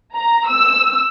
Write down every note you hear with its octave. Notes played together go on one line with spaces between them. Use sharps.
A#5
E6